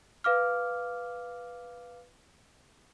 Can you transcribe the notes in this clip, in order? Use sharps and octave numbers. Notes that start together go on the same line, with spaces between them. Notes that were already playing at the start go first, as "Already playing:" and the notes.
B4 F5 D6 F6